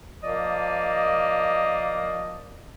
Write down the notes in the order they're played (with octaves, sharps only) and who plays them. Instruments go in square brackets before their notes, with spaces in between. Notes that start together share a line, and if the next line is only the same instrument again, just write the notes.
[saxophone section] F3 A#3 D5 D#5